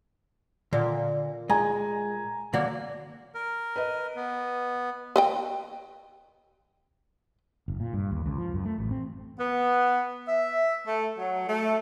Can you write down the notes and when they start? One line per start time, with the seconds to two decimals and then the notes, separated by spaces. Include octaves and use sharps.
0.73 A#2 D3
1.50 G#3 D#5 G#5 A#5
2.53 D3 F#3 A#3 F#4
3.35 A#4
3.76 B4 D#5
4.16 B3
5.16 B4 D#5 G5
7.68 F#1
7.80 A#2
7.93 G2
8.11 D#2
8.26 C#2
8.38 F3
8.54 F#2
8.65 A3
8.78 A1
8.91 C4
9.38 B3
10.28 E5
10.85 A3
11.18 F#3
11.48 A3